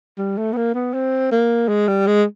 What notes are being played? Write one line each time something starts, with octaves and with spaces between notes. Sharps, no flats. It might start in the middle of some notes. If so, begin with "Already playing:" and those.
G3
A3
B3
A#3
B3
C4
A#3
G#3
G3
G#3